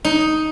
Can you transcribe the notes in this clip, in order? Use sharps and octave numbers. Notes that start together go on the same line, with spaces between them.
D#4